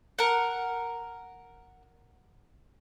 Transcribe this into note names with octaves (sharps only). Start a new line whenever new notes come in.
A#4 F#5